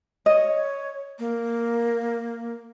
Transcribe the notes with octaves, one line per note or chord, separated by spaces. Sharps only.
C#5 D#5
A#3